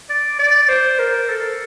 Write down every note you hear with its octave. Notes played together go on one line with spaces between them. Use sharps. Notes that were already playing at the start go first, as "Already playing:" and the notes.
D5
D5
C5
A#4
A4